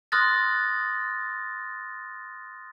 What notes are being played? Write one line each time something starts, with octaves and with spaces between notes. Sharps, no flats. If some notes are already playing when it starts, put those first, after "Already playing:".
C6 D#6 F6 F#6 A6 A#6